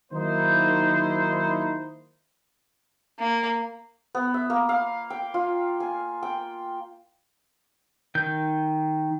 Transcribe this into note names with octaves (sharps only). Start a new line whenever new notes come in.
D#3 F#3 A#3 D#4 E4 C5
A#3
B3
E5
A#3
F5
G5
F4
G#5
G5
D#3 G6